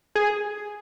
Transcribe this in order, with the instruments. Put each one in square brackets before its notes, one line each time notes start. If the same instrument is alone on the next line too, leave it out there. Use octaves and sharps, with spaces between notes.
[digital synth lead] G#4